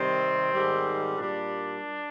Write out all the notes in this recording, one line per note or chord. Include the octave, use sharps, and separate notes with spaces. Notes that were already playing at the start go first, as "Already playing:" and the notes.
Already playing: C3 D#3 G3 C4
G#2 D#3 G3
A#2 G3 D4